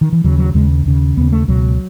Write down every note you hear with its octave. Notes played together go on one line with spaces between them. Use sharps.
D#3
E3
D#2 C#3 F#3
F#3
D#2 C#3 G#3
D#2 C#3
D#2 C#3 B3
A3
C#2 B2 F#3